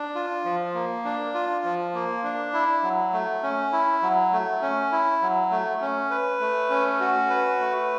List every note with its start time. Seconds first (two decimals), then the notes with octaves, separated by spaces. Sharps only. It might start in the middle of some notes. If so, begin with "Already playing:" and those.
Already playing: D4
0.15 F4
0.45 F3
0.75 A#3
1.05 D4
1.34 F4
1.64 F3
1.94 A#3
2.24 D4
2.54 E4
2.83 F#3
3.13 A3
3.43 C#4
3.73 E4
4.02 F#3
4.32 A3
4.62 C#4
4.92 E4
5.22 F#3
5.51 A3
5.81 C#4
6.11 B4
6.40 A3
6.70 C#4
7.00 F#4
7.30 B4
7.60 A3